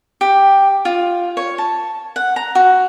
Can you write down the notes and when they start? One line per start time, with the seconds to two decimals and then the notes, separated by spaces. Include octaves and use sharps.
0.21 G4
0.85 F4
1.37 C#5
1.58 A5
2.16 F#5
2.36 A#5
2.55 F#4